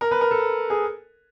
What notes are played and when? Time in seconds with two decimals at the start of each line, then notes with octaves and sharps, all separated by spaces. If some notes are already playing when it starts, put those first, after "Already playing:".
0.01 A#4
0.11 B4
0.21 A#4
0.31 A4
0.70 G#4